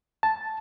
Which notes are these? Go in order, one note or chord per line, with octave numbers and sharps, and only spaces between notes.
A5